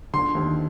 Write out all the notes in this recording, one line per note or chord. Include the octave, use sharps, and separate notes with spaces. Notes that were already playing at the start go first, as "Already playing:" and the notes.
D3 C6
D#2